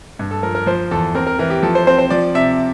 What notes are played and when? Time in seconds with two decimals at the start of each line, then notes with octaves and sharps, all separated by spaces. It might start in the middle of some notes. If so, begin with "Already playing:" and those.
0.19 G2
0.31 A4
0.43 F3 A#4
0.55 A#4
0.66 F3 C5
0.91 E2 A4
1.15 C4 A#4
1.27 A#4
1.39 E3 A#4
1.50 G4
1.63 F3 A4
1.75 C5
1.87 C4 C5
1.98 C5
2.10 F3 D5
2.35 C3 E5